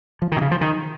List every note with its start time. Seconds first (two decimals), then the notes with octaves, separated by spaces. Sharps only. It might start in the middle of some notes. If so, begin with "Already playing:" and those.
0.22 F3
0.32 D#3
0.37 B2
0.41 C#3
0.51 F3
0.61 D#3